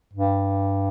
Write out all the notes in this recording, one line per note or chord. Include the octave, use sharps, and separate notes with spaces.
G2